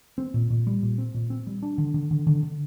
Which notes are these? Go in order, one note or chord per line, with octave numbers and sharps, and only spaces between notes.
C4
A#2
A#2
G3
A#2
C4
A#2
C4
G3
D4
D3
D3
D3
D3
D3